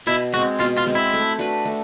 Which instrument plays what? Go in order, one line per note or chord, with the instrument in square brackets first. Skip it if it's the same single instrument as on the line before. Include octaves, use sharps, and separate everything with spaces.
[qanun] B2 [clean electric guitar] E4
[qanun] G#3 [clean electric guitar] F#4
[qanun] C4
[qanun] B2 [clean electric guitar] F4
[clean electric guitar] F4
[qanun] G#3 C4
[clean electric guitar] E4
[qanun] A3
D4 F#4 B4
A3